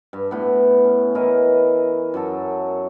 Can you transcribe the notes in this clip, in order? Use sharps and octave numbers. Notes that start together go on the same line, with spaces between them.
G2
A2 B3
C#4
E3 E4 A#4 D#5
F#2 F#3 A4